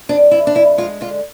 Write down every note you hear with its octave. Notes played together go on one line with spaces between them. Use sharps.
F2 D4
F2 E4
D4
F2 E4
G#3 F4
D3 F4